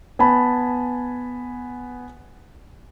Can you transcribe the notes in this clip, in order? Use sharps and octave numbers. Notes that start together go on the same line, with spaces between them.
B3 G#5 A5 B5